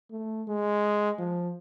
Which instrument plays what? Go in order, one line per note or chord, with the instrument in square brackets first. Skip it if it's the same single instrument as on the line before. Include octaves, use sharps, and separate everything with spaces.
[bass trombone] A3
G#3
F3